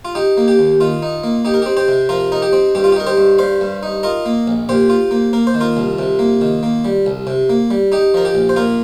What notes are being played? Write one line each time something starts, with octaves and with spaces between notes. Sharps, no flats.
F4
D#4 G4
A#3
G4
D#2
D#3 F4
D#4
A#3
D#4 G4
A#4
C4 G4
G4 C5
C3
F3 F4 A#4
D#4 A#4
G4
C4
G2 G4
F4
G4
D#4 A#4
G4 C5
G2
G3 C5 F5
G2
D#4
F4 A#4 D#5
A#3
A#1
A#2 G4 C5
F4
A#3
A#3 A#4
C5
D#3
F4 A#4
C2
C3
A#3
D#3
A#3
G3
C2
C3
A#3
G3
D#4 G4
F3 A#4
G4
A#1
C5
A#2 F4 A#4